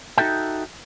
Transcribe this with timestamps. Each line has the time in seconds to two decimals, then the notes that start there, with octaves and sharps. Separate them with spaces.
0.18 D#4 F#4 A4 E5 G5